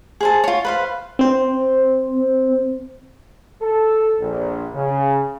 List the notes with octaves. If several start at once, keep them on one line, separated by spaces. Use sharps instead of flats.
G#4 C5 A5
F4 C#5
B4 C5 F5
C4 C5
A4
A#1
C#3